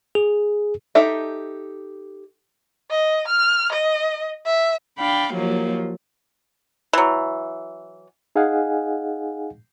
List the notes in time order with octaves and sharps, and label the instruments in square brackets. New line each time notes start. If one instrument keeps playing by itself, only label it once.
[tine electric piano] G#4
[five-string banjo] D#4 G4 A4 E5
[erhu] D#5
F6
D#5
E5
[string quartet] D4 F5 G5 B5
D#2 F3 F#3 A#3
[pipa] E3 F#3
[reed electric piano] D#4 G#4 D#5 F5 F#5 G#5